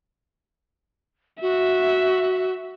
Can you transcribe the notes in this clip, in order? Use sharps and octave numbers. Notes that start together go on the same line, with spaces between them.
F#4 E5